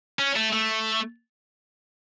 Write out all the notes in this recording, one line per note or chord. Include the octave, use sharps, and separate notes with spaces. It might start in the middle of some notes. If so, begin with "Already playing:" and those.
C#4
A3
A3